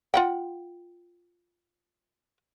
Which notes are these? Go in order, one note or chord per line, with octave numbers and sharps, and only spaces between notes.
F4 F#5 G5